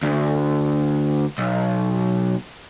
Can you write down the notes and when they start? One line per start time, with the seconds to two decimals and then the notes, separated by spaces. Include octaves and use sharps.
0.03 D2
1.38 B1